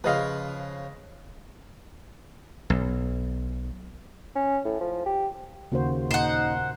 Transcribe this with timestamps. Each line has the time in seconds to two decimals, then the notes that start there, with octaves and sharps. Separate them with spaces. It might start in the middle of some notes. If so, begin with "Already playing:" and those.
0.04 C#3 F3 B4 D#5 F5
2.70 B1
4.36 C#4
4.65 A2
4.81 F3
5.06 G4
5.72 D#2 C#3 F#4 C5
6.11 A#2 D#4 C5 F#5